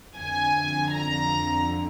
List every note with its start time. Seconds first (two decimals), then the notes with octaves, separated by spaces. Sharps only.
0.17 F2 D3 G#5
0.92 A#5